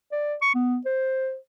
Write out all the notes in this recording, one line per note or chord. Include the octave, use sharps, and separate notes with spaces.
D5
C#6
B3
C5